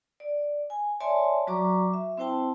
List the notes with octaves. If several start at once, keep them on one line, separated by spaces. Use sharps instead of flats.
D5
G#5
C#5 D5 E5 G#5 A5 C6
F#3 F#4 D5 A#5 C#6 D6
E5
C4 E4 C5 G5 A5 C6